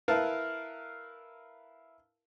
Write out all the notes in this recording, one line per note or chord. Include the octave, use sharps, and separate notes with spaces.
E4 A#4 B4 F5 A5